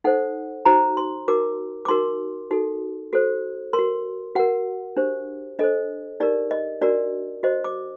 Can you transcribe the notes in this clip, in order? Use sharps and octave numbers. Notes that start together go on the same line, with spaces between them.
D#4 A4 C5 F#5
D#4 F#4 C5 A#5
C6
D#4 F#4 A#4 D6
D6
D#4 F#4 A#4 C6
D#4 F#4 A4
F#4 A4 C5
A#4 C6
F#4
F#4 A#4 F#5
D4 G4 C5
D4 A4 C5 D#5
D#4 G4 A#4 D5
D#5
D4 F#4 A#4 D5
F#4 C5 D#5
D6